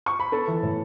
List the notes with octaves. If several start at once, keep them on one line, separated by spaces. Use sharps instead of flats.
C#6
B5
B3 A4 A5
E3
A2